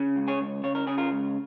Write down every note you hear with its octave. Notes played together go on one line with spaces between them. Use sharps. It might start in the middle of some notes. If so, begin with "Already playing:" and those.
Already playing: C#3
C#2
G#4 C#5
C#2
C#3 C#5
A#4
C#3 G#4
F4 A#4
C#2